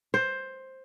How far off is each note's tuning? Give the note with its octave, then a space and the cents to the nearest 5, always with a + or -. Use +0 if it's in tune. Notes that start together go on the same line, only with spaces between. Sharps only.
C5 +10